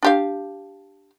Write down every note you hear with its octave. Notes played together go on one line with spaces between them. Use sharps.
D4 G4 F5